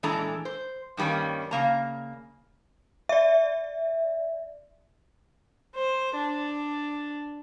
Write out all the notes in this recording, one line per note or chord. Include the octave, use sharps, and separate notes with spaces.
A#2 E3 G#3 D4 A4 A#5
C5
G2 D#3 G3 A#3 C#4
C#3 A#3 A#5
D5 E5
C5
D4